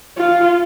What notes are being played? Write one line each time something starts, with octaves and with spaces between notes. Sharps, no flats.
F4